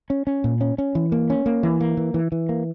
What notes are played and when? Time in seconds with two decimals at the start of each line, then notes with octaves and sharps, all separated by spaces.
0.10 C#4
0.27 C#4
0.44 A#2
0.61 C#4
0.78 C#4
0.95 E3
1.12 A#3
1.30 C#4
1.46 A#3
1.63 E3
1.80 A#3
1.97 E3
2.14 E3
2.32 E3
2.49 A#3